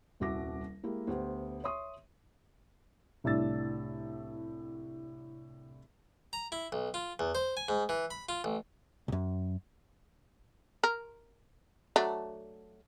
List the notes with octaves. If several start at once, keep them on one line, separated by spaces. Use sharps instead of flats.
D#1 C2 F#4 E5 D6 A#6
G#3 A#3 E4 G4
D2 B3 G4 C5
C#5 E5 C6 C#6 D#6
C2 A2 D4 E6 A6
A#5
E4
B1
F4
E2
C5
G#5
G#2
E3
B5
F4
A1
C2 F#2
A#4
F#3 A3 D4